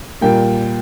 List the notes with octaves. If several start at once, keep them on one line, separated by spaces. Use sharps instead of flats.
A#2 G3 A#3 G5